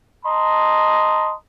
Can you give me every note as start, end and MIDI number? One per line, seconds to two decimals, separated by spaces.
0.25 1.33 75
0.25 1.33 81
0.25 1.33 82
0.25 1.33 84